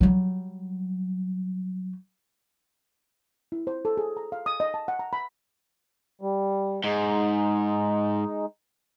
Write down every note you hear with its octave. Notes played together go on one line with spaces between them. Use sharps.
F#3 G3
E4
C5
A4
G#4
A#5
F5
D#6
D#5
A5
F#5
A#5
B5
G3
G#2 G#3 D#4